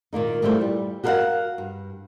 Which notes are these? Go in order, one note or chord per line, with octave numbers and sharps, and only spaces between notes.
A#2 D#3 A#3 D#4
A#2 E3 G3 A3 A#3 C5
G3
F#4 G4 A#4 B4 F5 F#5
G2